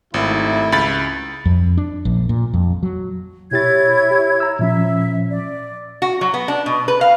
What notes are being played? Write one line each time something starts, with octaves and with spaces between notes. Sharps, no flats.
G#1 D#2 A3 E4
C#2 B5 A6
F2
D4
A#1
A#2
F2
F#3
B2 E4 G4 C#5 G#6 A6
G4
A#5 E6
A#2 F3 C#4 E5
D5
F#4
F#3
B3
D4
B2
B4
F5